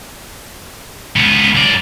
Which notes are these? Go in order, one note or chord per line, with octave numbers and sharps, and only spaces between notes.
C#2 B3
F#2 D5